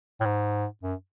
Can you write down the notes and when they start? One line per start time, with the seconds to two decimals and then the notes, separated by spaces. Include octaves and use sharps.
0.20 A2
0.25 G#2
0.83 F#2